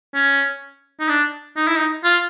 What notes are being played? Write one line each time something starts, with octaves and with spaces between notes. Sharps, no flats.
C#4
D#4
D4
D#4
E4
D#4
F4